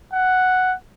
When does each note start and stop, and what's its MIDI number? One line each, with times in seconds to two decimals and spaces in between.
0.13 0.75 78